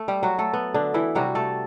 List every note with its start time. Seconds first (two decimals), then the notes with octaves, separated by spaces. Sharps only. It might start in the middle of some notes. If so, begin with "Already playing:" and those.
Already playing: A3
0.08 G3 G4
0.23 F#3 F#4
0.38 A3 A4
0.53 B3
0.74 D3 D4
0.94 E3 E4
1.15 C3 F#3 G3 F#4
1.35 A3 A4